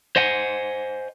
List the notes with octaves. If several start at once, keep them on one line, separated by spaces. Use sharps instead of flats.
C5 D#5 F#5 G#5